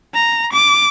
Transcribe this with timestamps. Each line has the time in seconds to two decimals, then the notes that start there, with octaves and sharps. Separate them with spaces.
0.15 A#5
0.53 D6